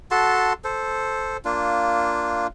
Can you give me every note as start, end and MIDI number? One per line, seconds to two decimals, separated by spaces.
0.11 0.53 66
0.11 0.53 69
0.11 0.53 81
0.11 0.53 84
0.64 1.37 69
0.64 1.37 72
1.45 2.47 58
1.45 2.47 62
1.45 2.47 65